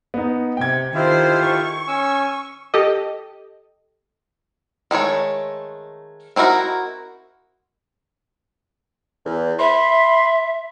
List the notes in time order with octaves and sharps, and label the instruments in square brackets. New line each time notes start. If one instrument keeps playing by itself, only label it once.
[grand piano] B3 D#4
[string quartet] C3 [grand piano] G5 G#6
[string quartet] D#3 A4 C5 [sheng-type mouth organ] E4 F4 G4
[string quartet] C#6
[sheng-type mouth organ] C#4 G#5 E6
[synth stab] G4 A4 D#5
[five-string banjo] D#3 G#3 A3 C#5
C4 D#4 E4 F#4 A#4
[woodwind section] E2
[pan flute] E5 [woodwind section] B5 C6